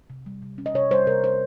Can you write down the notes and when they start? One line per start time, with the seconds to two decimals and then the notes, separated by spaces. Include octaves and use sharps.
0.10 C3
0.26 G3
0.42 C3
0.58 C#4
0.66 D#5
0.74 C3 C#5
0.91 G3 C5
1.07 C3 A#4
1.23 C#4 C5